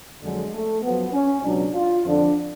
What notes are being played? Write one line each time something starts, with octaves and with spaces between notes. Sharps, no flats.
F2 D3 F#3 G#3
A3
F#2 F3 B3
C#4
C#2 B2 F#3 D4
F4
F2 D3 F3 D4